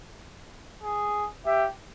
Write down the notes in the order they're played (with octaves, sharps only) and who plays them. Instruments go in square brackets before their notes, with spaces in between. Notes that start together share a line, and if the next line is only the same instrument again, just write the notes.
[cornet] G#4
[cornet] G4 [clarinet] E5